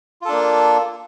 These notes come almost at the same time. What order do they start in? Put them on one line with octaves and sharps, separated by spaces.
F4 A4 D4 A#3